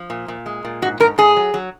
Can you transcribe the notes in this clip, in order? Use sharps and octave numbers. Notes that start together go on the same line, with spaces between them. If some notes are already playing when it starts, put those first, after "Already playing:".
Already playing: F3
A#2
A#2
G#3
A#2
G#2 F#4
G#2 A#4
G#2 G#4
F#3
F#3